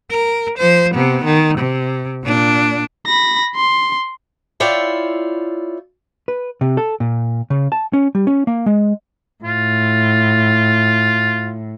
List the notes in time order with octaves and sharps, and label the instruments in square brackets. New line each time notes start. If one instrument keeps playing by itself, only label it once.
[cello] A#4
F3 C5
C3 B3
D#3
C3
A#2 D4
[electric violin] B5 A#6
C6
[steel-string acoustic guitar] E4 F4 C#5 D5 G5
[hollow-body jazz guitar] B4
C3
A4
A#2
C#3
A5
C#4
G3
C#4
A#3
G#3
[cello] A2 [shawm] F4